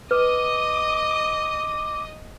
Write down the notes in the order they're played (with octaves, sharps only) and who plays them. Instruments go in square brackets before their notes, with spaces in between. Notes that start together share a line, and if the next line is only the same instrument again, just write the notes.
[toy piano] B4 [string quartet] D#5 D#6 [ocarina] D6